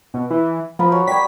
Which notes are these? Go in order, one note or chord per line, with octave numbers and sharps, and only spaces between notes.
B2
E3
F3 A#5 B5
F#4 C#5
G3 C#5 B6